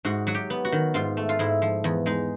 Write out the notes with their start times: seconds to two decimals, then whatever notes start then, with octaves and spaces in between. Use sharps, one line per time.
0.05 G#2 F#4
0.27 F#3 F#4
0.35 G4
0.50 B3
0.65 F#4
0.72 D#3
0.94 G#2 F4
1.17 A3
1.29 F4
1.39 G#2 E4
1.62 F3
1.84 E2
2.06 G#3 D#4